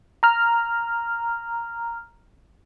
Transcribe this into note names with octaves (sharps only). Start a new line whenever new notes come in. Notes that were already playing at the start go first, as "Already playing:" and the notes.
A#5 F6